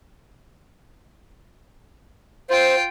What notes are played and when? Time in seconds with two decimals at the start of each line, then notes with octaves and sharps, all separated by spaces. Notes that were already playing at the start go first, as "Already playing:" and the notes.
2.50 F4 C5 G5